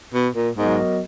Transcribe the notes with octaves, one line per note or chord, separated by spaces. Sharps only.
B2
A#2
G#2 F#3 B3 F#4 A#4 D#5